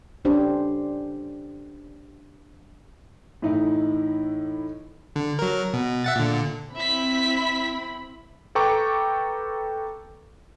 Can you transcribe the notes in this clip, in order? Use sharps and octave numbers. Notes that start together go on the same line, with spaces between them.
C#4 D4 G4 C5
A2 E3 D#4 E4
D3
F#3 A#4
B2
E5 F#5 A6
A#2 D3
C4 E4 E5 B5 B6
A4 B4 G5 A#5 C#6 D6